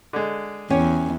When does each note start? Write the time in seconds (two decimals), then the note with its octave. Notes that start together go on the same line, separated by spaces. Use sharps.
0.13 D3 G#3
0.70 E2 C#4 G4 C#5